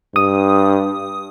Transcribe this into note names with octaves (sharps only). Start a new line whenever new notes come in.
G2 D#6